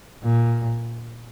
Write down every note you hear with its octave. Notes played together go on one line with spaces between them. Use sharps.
A#2